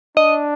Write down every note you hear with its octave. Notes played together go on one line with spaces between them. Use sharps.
D4 D#5